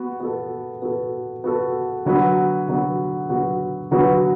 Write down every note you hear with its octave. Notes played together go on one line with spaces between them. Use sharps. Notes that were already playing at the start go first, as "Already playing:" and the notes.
Already playing: B3 F#4
B3 F#4 A4
B3 F#4 A4
B3 F#4 A4
D3 F#3 B3 F#4 B4
D3 F#3 B3 F#4 B4
D3 F#3 B3 F#4 B4
D3 F#3 B3 F#4 B4